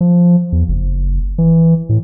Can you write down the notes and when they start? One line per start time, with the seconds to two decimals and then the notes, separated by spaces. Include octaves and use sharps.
0.01 F3
0.52 E2
0.68 F#1
1.38 E3
1.89 A2